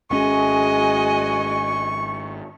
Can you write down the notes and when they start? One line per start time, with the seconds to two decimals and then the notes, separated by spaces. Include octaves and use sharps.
0.11 G#1 G#3 C#4 F#4 D#5 G#5 C#6